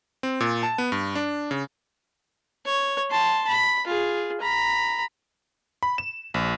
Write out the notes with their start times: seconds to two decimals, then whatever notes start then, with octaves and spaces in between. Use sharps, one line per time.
0.23 C4
0.40 A#2
0.63 A5
0.78 B3
0.92 G2
1.15 D4
1.51 C#3
2.65 C#5
3.11 A5 C6
3.48 B5
3.87 F4 G#4
4.41 A#5 B5
5.83 B5
5.98 E7
6.34 A#1